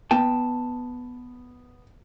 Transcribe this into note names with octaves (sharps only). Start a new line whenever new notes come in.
B3 G5 A5